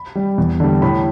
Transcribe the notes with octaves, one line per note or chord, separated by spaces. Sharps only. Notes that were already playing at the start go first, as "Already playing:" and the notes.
Already playing: B5
G3
E2
D3 G3
A2 B5